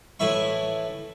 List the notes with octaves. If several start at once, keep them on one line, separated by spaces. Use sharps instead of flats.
A2 E3 E4 E5 C#6